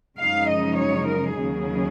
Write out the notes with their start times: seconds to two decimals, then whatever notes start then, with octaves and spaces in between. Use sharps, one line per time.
0.19 F#2 C#3 F3 G#3 D#4 F5
0.49 D#5
0.78 C#5
1.07 A#4
1.37 D#2 C#3 F#3 G#4